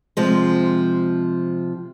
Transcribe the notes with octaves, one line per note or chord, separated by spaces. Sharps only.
C3 F3 G#3